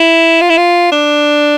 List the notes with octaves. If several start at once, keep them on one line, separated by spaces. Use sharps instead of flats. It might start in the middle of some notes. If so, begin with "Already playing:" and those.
Already playing: E4
F4
E4
F4
D4